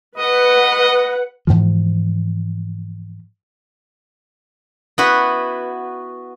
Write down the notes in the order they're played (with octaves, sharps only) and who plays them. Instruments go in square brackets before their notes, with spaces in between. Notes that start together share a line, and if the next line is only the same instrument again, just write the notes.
[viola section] B4 F#5 [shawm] D#5
[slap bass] G#2 C#3 E3 F3
[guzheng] B3 E4 F#4 B4